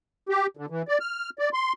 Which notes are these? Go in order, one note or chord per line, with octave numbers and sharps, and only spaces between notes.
G4
D3
E3
D5
F6
D5
C6